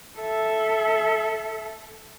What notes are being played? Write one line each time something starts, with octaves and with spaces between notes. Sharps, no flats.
A4 E5